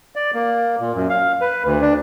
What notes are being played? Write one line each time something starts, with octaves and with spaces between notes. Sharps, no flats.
D5
A#3
A#2
F#2
F5
B4
D2
D4